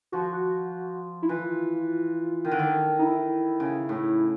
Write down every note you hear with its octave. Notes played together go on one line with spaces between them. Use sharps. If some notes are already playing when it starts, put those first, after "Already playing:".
F3 F#4
F#4
E4
E3 F4
D#3
D3
D#3
D#4
E4
C#3
A2